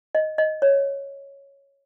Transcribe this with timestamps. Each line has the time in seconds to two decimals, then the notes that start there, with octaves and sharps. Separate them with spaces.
0.15 D#5
0.38 D#5
0.62 C#5